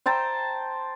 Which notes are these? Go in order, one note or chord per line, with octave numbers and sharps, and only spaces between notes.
C5 G5 A5 A#5